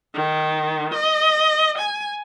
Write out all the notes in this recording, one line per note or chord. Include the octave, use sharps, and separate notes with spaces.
D#3
D#5
G#5